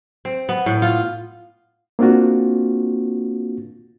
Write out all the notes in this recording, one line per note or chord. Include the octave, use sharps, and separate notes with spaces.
C4
B3
A2
F4
A#3 C4 D4 F4 F#4